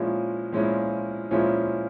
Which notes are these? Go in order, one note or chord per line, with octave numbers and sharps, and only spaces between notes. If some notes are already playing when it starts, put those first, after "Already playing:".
Already playing: A#2 F3 G#3 C#4 E4
A#2 F3 G#3 C#4 E4
A#2 F3 G#3 C#4 E4